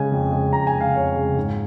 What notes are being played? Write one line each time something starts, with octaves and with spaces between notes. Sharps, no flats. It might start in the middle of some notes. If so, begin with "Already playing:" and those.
Already playing: C#3 G#3 G#5
F2
C#3 G#3
F2 A#5
G#5
C#3 G#3
F5
F2 C#5
C#3 G#3
G#2